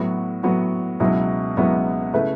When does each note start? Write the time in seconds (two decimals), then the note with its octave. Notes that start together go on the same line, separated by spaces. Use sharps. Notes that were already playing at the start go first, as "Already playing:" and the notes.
Already playing: A2 F#3 B3 F#4
0.43 A2 F#3 B3 F#4
1.00 C#2 B2 F#3 B3 E4
1.57 C#2 B2 F#3 B3 E4
2.13 C#3 A3 E4 B4